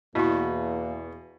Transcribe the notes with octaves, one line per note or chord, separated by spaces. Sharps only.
E2 B2 A#3 E4 F#4